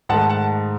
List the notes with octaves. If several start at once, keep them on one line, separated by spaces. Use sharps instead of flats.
G#2 D#3 A3 F#5 A5
F#5 A5